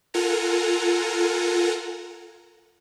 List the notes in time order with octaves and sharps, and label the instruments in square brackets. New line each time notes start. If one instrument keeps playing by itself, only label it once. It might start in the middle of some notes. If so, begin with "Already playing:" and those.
[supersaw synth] F4 A4 A#4 F#5 G#5 A#5